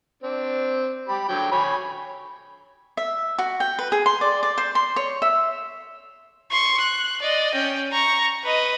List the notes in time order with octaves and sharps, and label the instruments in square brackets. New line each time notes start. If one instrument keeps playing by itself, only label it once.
[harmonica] C4 D4
G4 B5
D3 F#3 G5
C#5 G#5 B5
[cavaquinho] E5
F#4
G5
B4
G#4
C6
D5
D5
C5
C6
C#5
E5
[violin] C6 C#6
F#6
D5 D#5
C#4 G5
A#5 C#6
B4 D#5